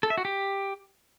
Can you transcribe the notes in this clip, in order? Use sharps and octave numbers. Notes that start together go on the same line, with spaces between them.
A4
E5
F#4
G4